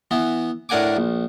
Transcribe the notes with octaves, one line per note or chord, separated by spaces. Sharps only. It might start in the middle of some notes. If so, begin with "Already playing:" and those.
E3 B3
A2 D4 A#4 F#5 G#5 D6
A#1